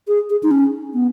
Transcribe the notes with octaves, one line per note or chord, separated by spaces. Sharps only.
G#4
G#4
D#4
C#4
B3